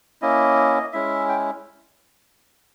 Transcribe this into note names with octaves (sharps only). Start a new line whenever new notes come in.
A#3 C#4 E4 D#5
G#3 C#4 E4 E5
G5